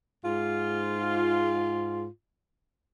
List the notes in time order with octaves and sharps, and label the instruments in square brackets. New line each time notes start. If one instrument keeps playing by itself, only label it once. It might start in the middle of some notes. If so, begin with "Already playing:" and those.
[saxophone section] G#2 F4